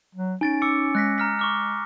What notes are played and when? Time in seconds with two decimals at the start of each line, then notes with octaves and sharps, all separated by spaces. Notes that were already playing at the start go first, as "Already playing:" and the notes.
0.15 F#3
0.41 C#4 D#4 G#5 A6 D7
0.62 D6 E6 C#7
0.95 G#3 F#6 A#6 B6
1.18 A#5 F6 B6
1.39 C#6 D6 F6